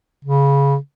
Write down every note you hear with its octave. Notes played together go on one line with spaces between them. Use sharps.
C#3